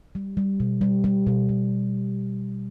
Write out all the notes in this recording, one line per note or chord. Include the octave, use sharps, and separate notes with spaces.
G3
G3
B2
G3
G3
B2
B2